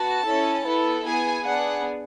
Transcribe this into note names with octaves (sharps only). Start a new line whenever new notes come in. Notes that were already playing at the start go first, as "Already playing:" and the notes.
Already playing: B3 F#4 A5
C#4 E4 A4
B3 E4 A4
B3 E4 G#4 G#5
B3 D4 G#4 F#5